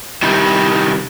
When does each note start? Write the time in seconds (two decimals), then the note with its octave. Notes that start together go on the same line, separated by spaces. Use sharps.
0.22 C3 D#3 G3